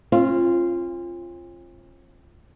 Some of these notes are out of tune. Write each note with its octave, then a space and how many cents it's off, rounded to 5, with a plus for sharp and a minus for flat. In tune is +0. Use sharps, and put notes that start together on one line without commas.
C4 +45 F4 -10